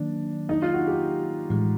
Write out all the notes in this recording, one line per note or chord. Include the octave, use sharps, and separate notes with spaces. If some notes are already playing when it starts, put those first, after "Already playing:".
Already playing: D#3 F#3 A#3 D4
D#4
F4
F#4
G4
A2 E3 G#3